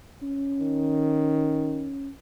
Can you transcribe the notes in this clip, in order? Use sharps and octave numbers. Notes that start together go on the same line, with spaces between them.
C#4
D#3